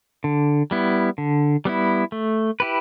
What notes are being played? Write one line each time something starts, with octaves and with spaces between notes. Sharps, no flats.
D3
G3 B3 E4
D3
G3 B3 E4
A3
E4 G4 B4